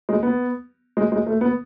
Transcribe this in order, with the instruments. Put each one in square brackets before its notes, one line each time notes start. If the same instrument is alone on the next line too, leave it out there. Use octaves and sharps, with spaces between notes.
[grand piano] G#3
B3
G#3
G#3
A3
B3